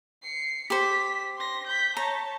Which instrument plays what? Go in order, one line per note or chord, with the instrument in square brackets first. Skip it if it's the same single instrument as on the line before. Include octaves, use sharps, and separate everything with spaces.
[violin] C7 C#7
[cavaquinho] G4 C5 [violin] B6
[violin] C6 A#6
G6 B6
[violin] C#5 A5 [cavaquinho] A#5